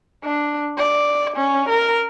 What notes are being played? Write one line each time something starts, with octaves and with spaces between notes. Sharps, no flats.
D4
D5
C#4
A#4